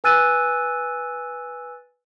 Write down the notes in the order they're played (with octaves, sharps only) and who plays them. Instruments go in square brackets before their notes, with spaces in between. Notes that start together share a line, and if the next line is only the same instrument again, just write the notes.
[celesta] B4 G#5 E6 F#6 A6 D#7